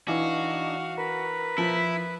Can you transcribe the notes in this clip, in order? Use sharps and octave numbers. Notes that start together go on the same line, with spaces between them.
E3 D4 D#4 F#4 F5
A#4 B4
F3 E4